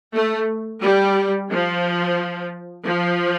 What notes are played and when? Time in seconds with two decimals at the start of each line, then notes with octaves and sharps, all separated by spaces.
0.15 A3
0.82 G3
1.51 F3
2.86 F3